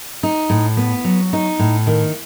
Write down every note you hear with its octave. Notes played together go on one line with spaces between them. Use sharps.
D#4
A2
B3
F#3
D#4
A2
D#3